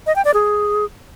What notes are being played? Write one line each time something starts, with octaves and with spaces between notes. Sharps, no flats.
D#5
G5
D5
G#4